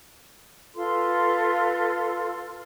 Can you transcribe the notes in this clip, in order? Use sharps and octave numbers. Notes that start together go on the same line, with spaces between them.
F4 A4 B4 C6